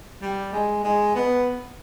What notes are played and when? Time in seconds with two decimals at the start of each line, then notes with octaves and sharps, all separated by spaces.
0.22 G3
0.53 G#3
0.84 G#3
1.15 B3